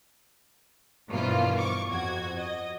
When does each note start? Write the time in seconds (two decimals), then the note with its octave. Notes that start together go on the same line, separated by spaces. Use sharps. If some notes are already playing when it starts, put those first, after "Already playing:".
1.09 G2 B2 E3 F3 A#3 F4
1.57 C#6 D6
1.88 F2 F#4 G#6
2.37 D#5